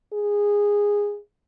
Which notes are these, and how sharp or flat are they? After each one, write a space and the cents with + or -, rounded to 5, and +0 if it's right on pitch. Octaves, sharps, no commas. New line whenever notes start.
G#4 -15